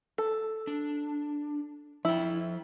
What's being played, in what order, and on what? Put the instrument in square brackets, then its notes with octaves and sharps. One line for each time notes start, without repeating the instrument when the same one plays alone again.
[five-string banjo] A4
[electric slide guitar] D4
[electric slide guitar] F3 G5 [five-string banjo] E4